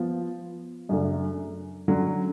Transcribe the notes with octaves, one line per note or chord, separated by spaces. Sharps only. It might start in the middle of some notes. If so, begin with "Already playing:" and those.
Already playing: F3 B3 F4
F#2 C#3 F#3 A3 D4
D3 F#3 C#4